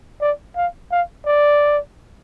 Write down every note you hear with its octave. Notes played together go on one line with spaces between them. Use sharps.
D5
F5
F5
D5